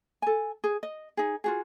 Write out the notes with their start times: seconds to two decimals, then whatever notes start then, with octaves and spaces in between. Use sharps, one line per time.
0.22 A4 G#5
0.64 G#4
0.83 D#5
1.17 D#4 G#4
1.44 F4 F#4 G#4